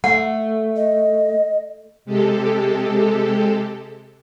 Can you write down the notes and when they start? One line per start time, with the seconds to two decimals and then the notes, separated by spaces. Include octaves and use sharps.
0.04 A3 F#5
0.77 D#5
2.05 C3 G#3 G4 A4